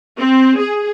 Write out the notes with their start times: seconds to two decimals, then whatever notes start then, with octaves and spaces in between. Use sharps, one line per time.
0.19 C4
0.60 G#4